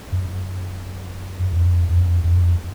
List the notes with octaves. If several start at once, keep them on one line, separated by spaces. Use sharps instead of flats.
F#2
F2
F2
F2